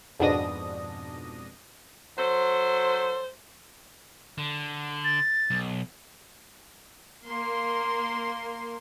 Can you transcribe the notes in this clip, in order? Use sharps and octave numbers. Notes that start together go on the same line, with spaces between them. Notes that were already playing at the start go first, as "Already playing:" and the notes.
F2 G#2 B2 D4 D#6 A#6
F#3 A4 C5
D3
A6
B1
A#3 C6